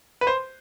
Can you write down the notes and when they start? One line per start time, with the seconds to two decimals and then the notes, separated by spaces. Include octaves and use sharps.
0.21 B4
0.27 C5